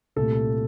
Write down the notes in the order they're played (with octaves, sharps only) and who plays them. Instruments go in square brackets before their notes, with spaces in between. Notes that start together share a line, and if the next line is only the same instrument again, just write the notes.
[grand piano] C2 A#2 A3 A4